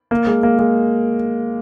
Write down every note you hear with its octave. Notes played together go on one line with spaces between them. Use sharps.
A#3
G#3
A#3
G#3